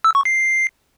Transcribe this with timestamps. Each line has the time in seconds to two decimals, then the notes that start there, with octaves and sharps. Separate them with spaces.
0.04 E6
0.15 C#6
0.25 C7